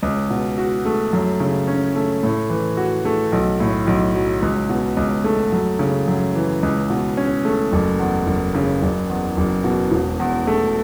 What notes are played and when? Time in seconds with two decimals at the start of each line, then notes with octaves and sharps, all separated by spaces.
0.03 C#2
0.30 B2
0.58 F#4
0.85 A3
1.13 F#2
1.40 C#3
1.68 C#4
1.95 A3
2.23 A2
2.50 E3
2.77 F#4
3.05 A3
3.32 B1
3.60 A2
3.87 B1
4.15 F#3
4.42 C#2
4.69 B2
4.97 C#2
5.24 A3
5.52 F#2
5.79 C#3
6.08 F#2
6.35 E3
6.63 C#2
6.90 B2
7.17 C#4
7.45 A3
7.72 F#1
8.00 E2
8.27 F#1
8.55 C#3
8.82 F#1
9.09 E2
9.37 F#1
9.64 B2
9.91 E1
10.20 E2
10.47 A3